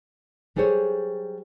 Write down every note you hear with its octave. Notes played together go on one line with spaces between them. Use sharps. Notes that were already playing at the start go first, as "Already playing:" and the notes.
F#3 G3 G#4 A4 C5 C#5